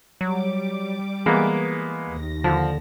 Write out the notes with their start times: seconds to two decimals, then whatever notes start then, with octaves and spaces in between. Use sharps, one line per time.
0.21 F#3 G3 D6
1.26 E3 G#3 A#3 B3
2.06 D#2 A#6
2.44 D3 F3